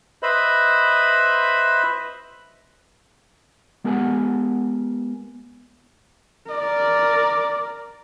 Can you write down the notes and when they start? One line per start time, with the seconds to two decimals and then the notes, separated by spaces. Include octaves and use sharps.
0.23 B4 C5 D#5 E5 B5
3.84 G#3 B3 G4 A#4 F#5 G#5
6.50 A#4 D5